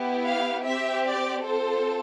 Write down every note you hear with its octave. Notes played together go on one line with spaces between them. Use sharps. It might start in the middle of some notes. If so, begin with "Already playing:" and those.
Already playing: B3 E4 G4
F5
C4 G4 E5
D5
C4 F4 A4 C5